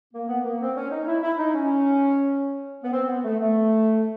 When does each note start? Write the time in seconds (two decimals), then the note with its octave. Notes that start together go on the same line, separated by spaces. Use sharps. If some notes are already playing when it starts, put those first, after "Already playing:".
0.13 A#3
0.28 B3
0.45 A#3
0.61 C4
0.76 C#4
0.91 D#4
1.07 E4
1.22 E4
1.38 D#4
1.54 C#4
2.83 B3
2.93 C4
3.08 B3
3.24 A3
3.40 A3